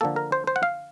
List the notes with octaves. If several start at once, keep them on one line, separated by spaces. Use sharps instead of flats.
D3 F3 A#3 A4
A#4
C5
C5
F#5
F5